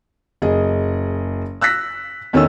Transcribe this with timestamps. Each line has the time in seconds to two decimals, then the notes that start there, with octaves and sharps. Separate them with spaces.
0.42 F#1 G#4 D#5
1.61 E6 F#6 A#6 B6
2.33 E2 D#3 C#4 A4 D#5 E6